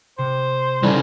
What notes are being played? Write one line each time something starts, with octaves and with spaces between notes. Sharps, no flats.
C3 C5
C#3 E3 G3 D#4 A4 A#4